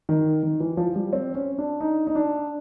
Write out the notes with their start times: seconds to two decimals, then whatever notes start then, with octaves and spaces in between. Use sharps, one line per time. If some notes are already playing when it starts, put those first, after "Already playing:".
0.09 D#3
0.43 D#3
0.60 E3
0.77 F3
0.96 G3
1.13 C4
1.35 C#4
1.58 D4
1.81 D#4
2.07 D#4
2.15 D4